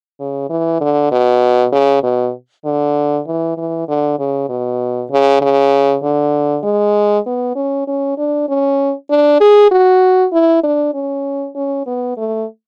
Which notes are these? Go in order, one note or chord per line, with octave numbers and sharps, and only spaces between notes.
C#3
E3
D3
B2
C#3
B2
D3
E3
E3
D3
C#3
B2
C#3
C#3
D3
G#3
B3
C#4
C#4
D4
C#4
D4
G#4
F#4
E4
D4
C#4
C#4
B3
A3